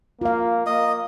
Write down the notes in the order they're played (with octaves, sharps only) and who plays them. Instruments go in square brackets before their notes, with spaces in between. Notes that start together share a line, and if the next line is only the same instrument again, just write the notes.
[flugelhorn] A#3 [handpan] F4 F5
[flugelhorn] A#3 [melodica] D#5